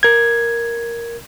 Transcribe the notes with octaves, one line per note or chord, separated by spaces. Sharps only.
A#4 G#6